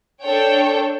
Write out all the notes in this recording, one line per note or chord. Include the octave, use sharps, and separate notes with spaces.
D4 A4 C#5 G5